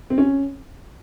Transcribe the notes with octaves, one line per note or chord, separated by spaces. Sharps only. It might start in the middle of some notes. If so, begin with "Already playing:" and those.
C4
C#4